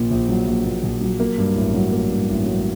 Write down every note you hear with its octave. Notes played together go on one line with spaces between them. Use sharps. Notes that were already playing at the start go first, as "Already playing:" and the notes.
Already playing: A#1 A#2
A#1
F#3
A#1
A#2
A#1
F#3
A#3
G2
A1
F#3
A#3
G2
A1
F#3